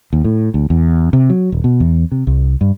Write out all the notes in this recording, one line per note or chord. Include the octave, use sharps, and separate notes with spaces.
D#2
A2
D2
E2
C3
F#3
D#1
B2
E2
C3
C2
G2